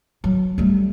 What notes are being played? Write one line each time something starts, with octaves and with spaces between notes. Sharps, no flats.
F#3
G3 A3